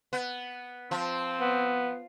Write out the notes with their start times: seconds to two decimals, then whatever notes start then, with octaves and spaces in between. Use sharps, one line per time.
0.13 B3
0.91 F3 C4
1.41 B3